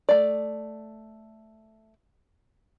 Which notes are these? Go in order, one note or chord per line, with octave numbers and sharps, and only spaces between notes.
A3 D5